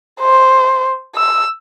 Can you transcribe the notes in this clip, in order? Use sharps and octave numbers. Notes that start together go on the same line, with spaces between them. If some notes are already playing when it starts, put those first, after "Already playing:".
C5
E6